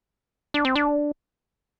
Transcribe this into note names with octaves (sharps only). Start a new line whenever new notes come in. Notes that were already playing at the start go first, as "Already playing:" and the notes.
D4
C4
D4